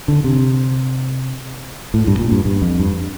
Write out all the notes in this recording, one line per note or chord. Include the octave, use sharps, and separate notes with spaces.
D3
C3
A2
G2
A#2
G2
G2
F2
G2